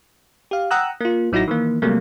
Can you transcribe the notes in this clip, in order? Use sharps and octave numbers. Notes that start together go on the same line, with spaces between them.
G4 F5
F#5 G5 A#5 D#6 E6 F#6
A#3 F4
A1 F#3 D#4 E4 F#4 A#6
D#3 E3 A#3
C3 F#3 G3 A3 A#3